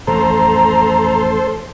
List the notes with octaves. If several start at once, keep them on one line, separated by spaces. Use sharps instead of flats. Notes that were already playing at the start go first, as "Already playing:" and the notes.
A1 F2 A4 C5 A#5